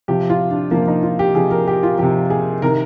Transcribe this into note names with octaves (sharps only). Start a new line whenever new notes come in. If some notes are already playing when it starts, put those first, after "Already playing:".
C3 F3 G4
F4
D4
C3 F3 A#3
D#4
F4
G4
C3 F3 G#4
A#4
G4
F4
C3 F3 G4
G#4
C3 D#3 A#4